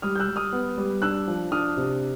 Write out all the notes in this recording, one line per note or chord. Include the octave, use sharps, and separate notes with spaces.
G3 D#6 F6
G6
E6 F#6
G3
D#6 F6
B3
G3
D4 E6 F#6
F3
D4 D#6 F6
C3